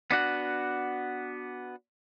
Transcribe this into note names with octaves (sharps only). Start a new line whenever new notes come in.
B3 D4 F#4 F#5